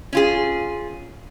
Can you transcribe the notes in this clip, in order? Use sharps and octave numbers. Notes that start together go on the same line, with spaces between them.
C#4 F4 G#4